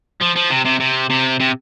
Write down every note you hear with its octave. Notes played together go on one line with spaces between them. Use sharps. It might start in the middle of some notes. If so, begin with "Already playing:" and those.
F3
F3
C3
C3
C3
C3
C3